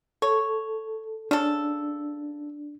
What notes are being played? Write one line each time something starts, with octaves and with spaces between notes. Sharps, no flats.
A4 C#5
C#3 D4 A4